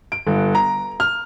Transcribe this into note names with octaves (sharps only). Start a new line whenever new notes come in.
D7
G1
A#5
F6